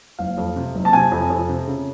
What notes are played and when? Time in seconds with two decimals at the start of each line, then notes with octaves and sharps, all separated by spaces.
0.19 F#1 F5
0.37 F2
0.56 C3
0.74 F#1
0.85 A5
0.93 C3 G#5
1.12 F2
1.30 F2
1.49 C3
1.67 C#3